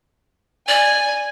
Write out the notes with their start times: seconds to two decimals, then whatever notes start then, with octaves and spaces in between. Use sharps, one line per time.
0.68 D5 G#5